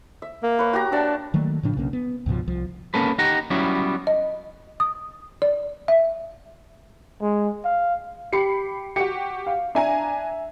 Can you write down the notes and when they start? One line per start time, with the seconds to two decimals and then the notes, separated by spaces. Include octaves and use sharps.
0.22 E5
0.43 A#3
0.59 B4 C#5
0.73 F#4 G4 A#5
0.92 D4 E5 F#5 A5
1.34 D#3 F#3 A3 A#3
1.63 A2 C#3 F3 D4
1.77 B1 C#3 A#3 C#4
1.93 B3
2.26 C#2 G#2 B2 F3
2.47 C2 F3
2.94 A#3 C#4 A4 B4
3.19 D#4 G4 F#5 A#5
3.50 F#3 G3 B3 C#4 E4
4.07 D#5
4.80 D#6
5.42 D5
5.88 E5
7.22 G#3
7.65 F5
8.33 G4 B5 C7 C#7
8.96 F#4 G4 C#7
9.47 F5
9.75 D4 E5 G#5 A#5